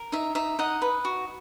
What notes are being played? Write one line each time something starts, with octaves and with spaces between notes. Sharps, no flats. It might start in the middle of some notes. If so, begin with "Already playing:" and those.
Already playing: A#4
D#4 E5
D#4 E5
D#4 D#5 F#5
B4
F#4